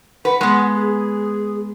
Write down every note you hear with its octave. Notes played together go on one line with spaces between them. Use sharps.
B4 F#5
G#3 B3
G#4